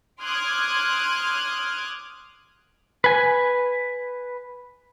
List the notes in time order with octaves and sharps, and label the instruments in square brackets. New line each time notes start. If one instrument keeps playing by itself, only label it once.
[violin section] C6 D6 D#6 F6 F#6 G#6
[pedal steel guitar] B4 G#5